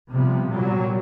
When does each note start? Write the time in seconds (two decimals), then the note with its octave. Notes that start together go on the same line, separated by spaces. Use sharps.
0.10 C3 F3 G3 B3
0.51 A#2 F#3 G3